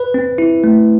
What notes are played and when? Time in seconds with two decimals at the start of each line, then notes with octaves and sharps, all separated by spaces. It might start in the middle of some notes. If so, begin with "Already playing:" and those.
Already playing: B4
0.14 C4
0.38 E4
0.64 A3